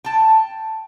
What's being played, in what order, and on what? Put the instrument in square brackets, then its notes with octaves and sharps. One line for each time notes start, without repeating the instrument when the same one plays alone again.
[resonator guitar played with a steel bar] G5 A5